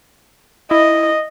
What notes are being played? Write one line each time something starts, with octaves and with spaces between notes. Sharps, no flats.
E4 D#5